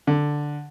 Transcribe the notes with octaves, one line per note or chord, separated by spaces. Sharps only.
D3